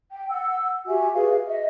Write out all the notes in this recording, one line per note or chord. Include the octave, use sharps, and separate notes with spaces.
G5
F#5 E6
F#4 G4 E5 G#5
F#4 G#4 B4 F5
D#5 E5